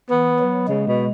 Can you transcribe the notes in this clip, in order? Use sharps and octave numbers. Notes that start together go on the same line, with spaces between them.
E3 B3
F#3
C#3 G#3
B2